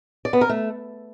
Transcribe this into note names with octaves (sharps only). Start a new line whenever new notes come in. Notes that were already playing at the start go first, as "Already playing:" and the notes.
D5
B3
A#4
A3